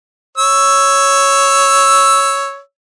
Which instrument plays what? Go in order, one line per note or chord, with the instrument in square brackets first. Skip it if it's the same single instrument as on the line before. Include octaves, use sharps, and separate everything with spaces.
[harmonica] C#5 E6